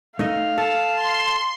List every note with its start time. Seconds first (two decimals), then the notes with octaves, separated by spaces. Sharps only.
0.19 A3 D#4 D#5 F5
0.58 A4 A5
0.95 C6